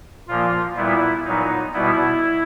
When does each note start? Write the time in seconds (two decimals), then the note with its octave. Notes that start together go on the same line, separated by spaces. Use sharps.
0.29 A#2 F3 A#3 F4
0.77 A#2 G3 B3 E4
1.25 A#2 F#3 B3 D#4
1.74 B2 G3 B3 E4